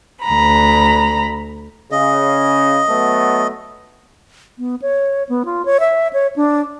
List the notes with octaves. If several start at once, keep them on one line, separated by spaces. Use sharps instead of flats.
D2 A#5 B5
C#3 D#5
F#3 A3 B3
B3
C#5
B3
F4
C#5
E5
C#5
D4